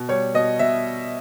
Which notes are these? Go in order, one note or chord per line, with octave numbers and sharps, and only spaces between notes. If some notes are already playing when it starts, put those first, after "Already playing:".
Already playing: B2
G3 C#5
B2 D#5
B2 E5